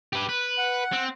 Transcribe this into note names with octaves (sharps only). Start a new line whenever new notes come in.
G4 B4
B4
F#5
C4